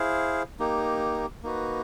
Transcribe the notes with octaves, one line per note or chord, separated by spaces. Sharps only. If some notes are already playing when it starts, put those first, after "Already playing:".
Already playing: E4 G#4 C5 F5
A#3 D#4 G4
A#3 D#4 F#4 B4